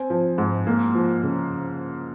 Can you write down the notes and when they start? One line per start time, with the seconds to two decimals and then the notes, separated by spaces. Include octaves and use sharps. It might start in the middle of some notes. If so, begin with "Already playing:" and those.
Already playing: C4 G#5
0.10 F3
0.38 G#2
0.67 A#3
0.95 F3
1.23 C#3